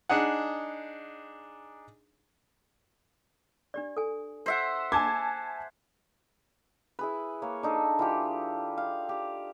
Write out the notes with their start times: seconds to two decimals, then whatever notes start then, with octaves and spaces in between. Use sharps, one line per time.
0.09 D4 D#4 G#4 F#5
3.74 D4 G4 D5
3.97 A4 G#5
4.46 C5 E5 F#5
4.92 G#5 A5 D6 G#6
6.99 E4 G#4 B4
7.42 A#3 C#5
7.63 D4 D#4 A4
7.99 E3 F4 G4
8.78 F5
9.09 G4